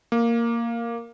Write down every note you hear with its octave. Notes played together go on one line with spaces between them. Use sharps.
A#3